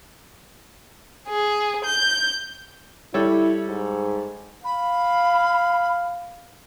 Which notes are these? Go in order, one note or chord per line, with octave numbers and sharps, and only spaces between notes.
G#4
G6
G3 E4 A4 C#5
G#2
F5 B5